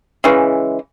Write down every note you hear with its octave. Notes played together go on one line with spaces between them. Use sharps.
C#3 E3 G#3